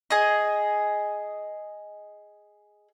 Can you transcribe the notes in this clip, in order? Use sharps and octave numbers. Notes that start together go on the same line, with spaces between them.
G#4 D#5